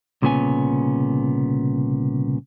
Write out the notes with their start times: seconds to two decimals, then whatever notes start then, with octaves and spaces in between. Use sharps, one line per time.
0.22 C2 A#2 C#3 B3 C#4 G#5